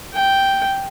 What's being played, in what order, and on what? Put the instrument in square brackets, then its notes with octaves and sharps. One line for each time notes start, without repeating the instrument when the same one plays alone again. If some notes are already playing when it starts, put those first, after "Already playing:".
[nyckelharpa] G5